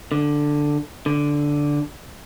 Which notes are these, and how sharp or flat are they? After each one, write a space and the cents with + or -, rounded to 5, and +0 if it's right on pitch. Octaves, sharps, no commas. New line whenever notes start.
D3 +5
D3 -5